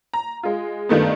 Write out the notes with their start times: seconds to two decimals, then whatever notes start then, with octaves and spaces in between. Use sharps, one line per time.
0.13 A#5
0.43 G#3 F4
0.89 G2 D#3 A3 B3